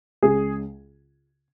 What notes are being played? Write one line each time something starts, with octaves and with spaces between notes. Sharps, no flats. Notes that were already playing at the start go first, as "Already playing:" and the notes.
C#2 C#3 G#3 G#4